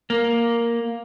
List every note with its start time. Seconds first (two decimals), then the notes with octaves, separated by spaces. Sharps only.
0.10 A#3